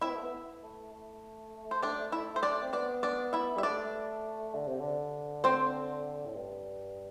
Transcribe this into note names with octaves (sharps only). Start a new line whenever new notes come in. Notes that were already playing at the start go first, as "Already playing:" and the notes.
C4 E4 E5
B3
A3
B3
A3
A3
C5
D4 D5
E4 E5
C5
D4 D5
C4
B3 D4 D5
D4 D5
E4 E5
G3 E5
A3 D4 D5
D3
C3
D3
C4 C5
A2
G2